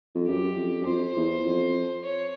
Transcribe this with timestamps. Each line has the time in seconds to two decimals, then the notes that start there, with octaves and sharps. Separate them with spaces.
0.15 F2
0.28 F#2 G4
0.57 F2
0.81 F#2
0.86 F2 C5
1.16 E2
1.45 F2
2.05 C#5